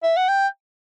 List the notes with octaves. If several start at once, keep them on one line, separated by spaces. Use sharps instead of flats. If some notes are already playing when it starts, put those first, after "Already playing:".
E5
F#5
G5